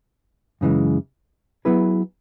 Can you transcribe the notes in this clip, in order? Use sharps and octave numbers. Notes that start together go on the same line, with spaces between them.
F#2 C#3 E3 G#3
F#3 B3 E4 G#4 B4